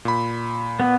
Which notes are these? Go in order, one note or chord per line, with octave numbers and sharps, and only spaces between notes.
A#2 B5
B3